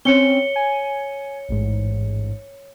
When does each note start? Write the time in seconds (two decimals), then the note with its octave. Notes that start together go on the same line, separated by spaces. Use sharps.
0.05 C4 C#4 C#5 C#7 G7
0.56 G#5
1.49 A1 G#2